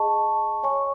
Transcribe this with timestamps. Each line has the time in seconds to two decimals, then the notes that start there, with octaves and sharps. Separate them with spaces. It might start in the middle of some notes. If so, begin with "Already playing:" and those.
Already playing: G#4 D#5 A5 C#6
0.63 C#5 G#5 C#6